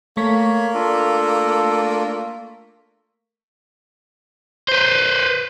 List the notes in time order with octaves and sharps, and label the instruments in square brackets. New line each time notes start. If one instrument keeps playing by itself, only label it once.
[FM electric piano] A3 C#6 B6 [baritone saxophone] A#3 [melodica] C#5
[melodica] D4 F4 A4
[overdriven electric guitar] B4 C5